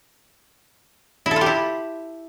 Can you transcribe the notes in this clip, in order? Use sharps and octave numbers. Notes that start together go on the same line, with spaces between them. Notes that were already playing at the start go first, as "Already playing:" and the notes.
E4
A4
F4
G4
E4